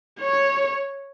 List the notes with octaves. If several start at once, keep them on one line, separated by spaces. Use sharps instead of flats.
C#5